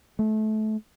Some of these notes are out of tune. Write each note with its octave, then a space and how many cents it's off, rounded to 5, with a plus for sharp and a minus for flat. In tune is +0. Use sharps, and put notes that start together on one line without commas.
A3 -25